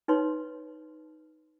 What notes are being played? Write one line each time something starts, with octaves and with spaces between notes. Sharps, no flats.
D#4 B4 C#5 C6